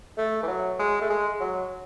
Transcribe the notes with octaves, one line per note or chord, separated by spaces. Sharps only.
A3
E3
F#3
G#3
A3
G#3
F#3